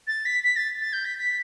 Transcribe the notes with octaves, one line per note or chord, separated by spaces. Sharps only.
A6
B6
B6
A6
A6
G6
B6
B6